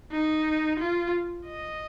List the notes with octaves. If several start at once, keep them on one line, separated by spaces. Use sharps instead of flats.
D#4
F4
D#5